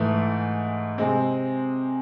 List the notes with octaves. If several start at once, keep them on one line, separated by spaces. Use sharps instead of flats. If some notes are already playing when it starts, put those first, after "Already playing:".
Already playing: G#2 E3 A3
C3 G#3 C4